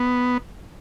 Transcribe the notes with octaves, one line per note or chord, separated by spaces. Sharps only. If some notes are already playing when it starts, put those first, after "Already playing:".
Already playing: B3